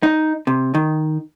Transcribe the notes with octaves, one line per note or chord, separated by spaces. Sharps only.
D#4
C3
D#3